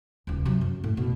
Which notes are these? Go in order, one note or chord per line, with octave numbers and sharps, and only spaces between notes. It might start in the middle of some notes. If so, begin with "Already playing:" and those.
D#1 C#2
C3 F#3
F#2
A2
B2